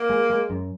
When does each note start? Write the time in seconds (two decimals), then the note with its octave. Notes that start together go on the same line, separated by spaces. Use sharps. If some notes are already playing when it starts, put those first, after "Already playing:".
Already playing: A#3
0.10 G#3
0.30 G#3
0.50 F#2